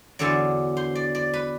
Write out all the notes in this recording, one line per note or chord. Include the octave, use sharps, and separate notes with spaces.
E2 D3 F#3 D5
C5
D5
D5
B4